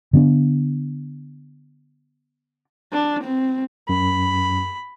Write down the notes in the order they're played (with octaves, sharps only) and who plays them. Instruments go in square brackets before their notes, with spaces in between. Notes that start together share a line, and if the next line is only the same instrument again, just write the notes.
[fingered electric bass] D3 B3 C#4 D4
[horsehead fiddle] D4
C4
[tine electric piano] F#2 [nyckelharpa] B5